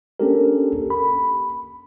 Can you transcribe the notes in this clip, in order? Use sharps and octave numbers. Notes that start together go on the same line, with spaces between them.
A#3 C#4 D4 G4 A4 A#4
B5